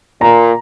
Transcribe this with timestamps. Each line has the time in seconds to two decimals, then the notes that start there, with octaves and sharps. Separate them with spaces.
0.21 A#2 A#5